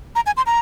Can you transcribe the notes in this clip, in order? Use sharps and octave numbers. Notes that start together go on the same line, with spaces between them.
A#5
G#5
C6
A#5